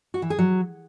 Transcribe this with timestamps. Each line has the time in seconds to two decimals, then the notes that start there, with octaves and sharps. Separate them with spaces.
0.14 F#4
0.22 E3
0.30 G#4
0.39 F#3